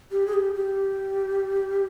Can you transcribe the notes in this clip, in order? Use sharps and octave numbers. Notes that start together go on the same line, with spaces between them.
G4
G#4
G4
G4